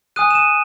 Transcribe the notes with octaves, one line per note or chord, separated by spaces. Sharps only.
G#5 D#6 F#6 D#7
E7
D#7